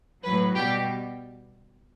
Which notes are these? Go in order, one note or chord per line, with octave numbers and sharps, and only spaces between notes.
A2 F#3 B4
B2 G3 G4